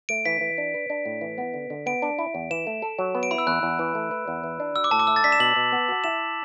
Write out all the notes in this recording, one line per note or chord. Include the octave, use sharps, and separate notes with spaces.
A3 D7
E3 B6
E3
D4
B4
D4
A2
E3
B3
D3
D3
B3 D7
D4
E4
E2
E3 E7
A3
A4
F#3
B3
D7
E4 B5
E6
E2 F#6
E2
E3
A3
B4
E2
E3
D4
F#4 E6
D6
A2 A5
D6
A3 E6
A6
D4 B6
E7
B2 F#7
B2
B3
F#4
E4 E7